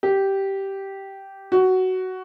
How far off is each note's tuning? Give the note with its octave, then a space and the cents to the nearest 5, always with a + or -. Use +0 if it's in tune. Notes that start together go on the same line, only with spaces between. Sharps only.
G4 -10
F#4 +10